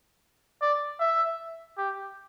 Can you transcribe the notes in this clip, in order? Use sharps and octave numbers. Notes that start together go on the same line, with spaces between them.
D5
E5
G4